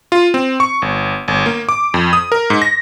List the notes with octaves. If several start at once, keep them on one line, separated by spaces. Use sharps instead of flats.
F4
C4
C#6
G1
G1
A#3
D6
F2
D#6
A#4
G#2
A#6